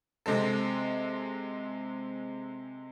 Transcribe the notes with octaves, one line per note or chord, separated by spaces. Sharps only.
C3 G#3 C4 A4